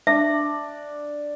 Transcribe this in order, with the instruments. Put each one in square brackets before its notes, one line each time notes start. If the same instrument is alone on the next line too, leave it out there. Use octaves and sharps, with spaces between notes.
[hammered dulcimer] D4 [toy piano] E5